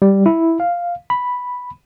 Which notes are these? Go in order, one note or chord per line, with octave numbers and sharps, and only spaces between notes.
G3
E4
F5
B5